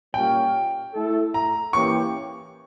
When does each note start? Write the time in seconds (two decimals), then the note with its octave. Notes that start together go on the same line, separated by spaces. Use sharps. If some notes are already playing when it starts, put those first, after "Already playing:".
0.14 A#2 G3 A#3 C#4 G5
0.94 A3 E4 A4
1.34 A#5
1.73 E3 A#3 C#4 G4 C#6